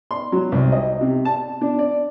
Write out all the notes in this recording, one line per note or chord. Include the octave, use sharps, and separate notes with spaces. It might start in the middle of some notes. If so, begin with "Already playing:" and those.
C6
F#3
C2
D#5
C3
A5
D4
D5